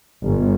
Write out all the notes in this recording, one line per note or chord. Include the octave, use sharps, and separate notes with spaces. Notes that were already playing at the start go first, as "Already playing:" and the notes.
G1